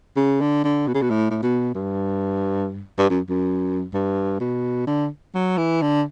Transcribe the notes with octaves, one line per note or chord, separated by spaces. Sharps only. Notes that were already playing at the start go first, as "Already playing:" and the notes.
C#3
D3
D3
B2
C#3
B2
A2
A2
B2
G2
G2
F#2
F#2
G2
B2
D3
F#3
E3
D3